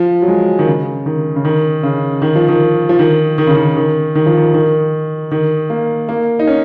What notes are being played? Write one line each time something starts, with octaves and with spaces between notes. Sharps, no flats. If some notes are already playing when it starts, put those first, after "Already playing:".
Already playing: F3
F#3
G#3
D#3
C#3
D#3
C#3
D#3
C#3
D#3
F3
D#3
F3
D#3
D#3
C#3
D#3
D#3
D#3
F3
D#3
D#3
D#3
A#3
A#3
D#4
C#4